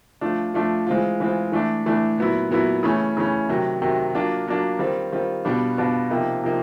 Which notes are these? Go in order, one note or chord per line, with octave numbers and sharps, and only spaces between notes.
F3 A3 D4 F4
F3 A3 D4 F4
E3 G#3 C4 F4
E3 G#3 C4 F4
E3 A3 D4
E3 A3 D4
A#2 F#3 B3 E4
A#2 F#3 B3 E4
C#3 E3 A3 C#4
C#3 E3 A3 C#4
C3 D#3 F#3
C3 D#3 F#3
F#3 A#3 D4 F4
F#3 A#3 D4 F4
D#3 G3 C4 F4
D#3 G3 C4 F4
B2 G3 B3 D4 F4
B2 G3 B3 D4 F4
C3 F3 A#3 D#4
C3 F3 A#3 D#4